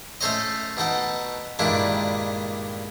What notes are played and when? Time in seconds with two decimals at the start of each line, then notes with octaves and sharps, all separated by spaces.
0.21 A3 C#4 A4 C5 C#5 D#5
0.77 B2 D#4 A4 F#5
1.59 G2 A#2 D#3 G#3 D4 E4